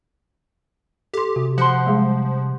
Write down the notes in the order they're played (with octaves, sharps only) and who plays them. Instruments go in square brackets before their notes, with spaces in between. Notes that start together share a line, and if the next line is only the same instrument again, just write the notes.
[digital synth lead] G4 [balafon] A4 C6
[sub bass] C3 [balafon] F#4
[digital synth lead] F3 [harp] F#5 C6
[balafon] G3 G#3 G#4